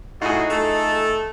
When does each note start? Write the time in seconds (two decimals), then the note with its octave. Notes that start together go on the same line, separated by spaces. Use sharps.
0.22 A2 D#4 F4 F#4 G#4
0.50 A3 A4